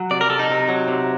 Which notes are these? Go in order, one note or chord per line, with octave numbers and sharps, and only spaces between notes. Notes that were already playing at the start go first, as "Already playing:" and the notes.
Already playing: F#3
C3 D5
A#4
C3 A4
D#4
C3
F#3
C3